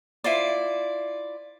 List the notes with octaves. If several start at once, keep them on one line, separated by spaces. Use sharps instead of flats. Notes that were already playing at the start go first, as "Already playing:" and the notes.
E4 F4 C5 D5